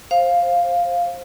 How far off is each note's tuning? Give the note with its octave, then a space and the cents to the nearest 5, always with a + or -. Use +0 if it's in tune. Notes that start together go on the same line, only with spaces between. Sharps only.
C5 +15 F5 +0